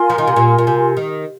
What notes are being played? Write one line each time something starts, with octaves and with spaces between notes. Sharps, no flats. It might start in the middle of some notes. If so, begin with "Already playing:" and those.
Already playing: F4 A#4 G#5 C6
F3
D#3
C3
A#2
A#2
C3
D#3